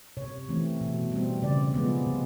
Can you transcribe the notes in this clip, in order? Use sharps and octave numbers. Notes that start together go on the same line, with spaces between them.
C3 C#5
E3 A3 C4
B2
G3 C4
C#3 D5
F3 G#3 B3
C3